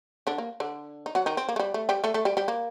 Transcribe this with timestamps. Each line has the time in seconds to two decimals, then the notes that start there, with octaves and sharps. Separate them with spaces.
0.27 D3 D4
0.38 A#3
0.60 D3 D4
1.06 D#4
1.15 F#3 F#4
1.26 D#3 D#4
1.37 C4
1.49 A#3
1.56 A3
1.60 G3
1.74 A3
1.89 G3 G4
2.04 A3 A4
2.14 A3 A4
2.25 G3 G4
2.37 G3 G4
2.48 A#3